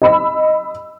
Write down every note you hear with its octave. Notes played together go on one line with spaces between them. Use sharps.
D#5 B5 E6